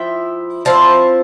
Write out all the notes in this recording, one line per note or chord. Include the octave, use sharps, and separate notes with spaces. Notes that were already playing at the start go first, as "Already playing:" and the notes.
Already playing: F3 E4 E5 G5
F3 C4 E4 F5 A5